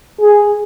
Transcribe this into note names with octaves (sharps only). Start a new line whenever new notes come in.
G#4